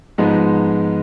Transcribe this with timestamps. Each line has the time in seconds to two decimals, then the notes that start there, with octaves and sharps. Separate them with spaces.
0.18 G#2 F3 G#3 B3 D#4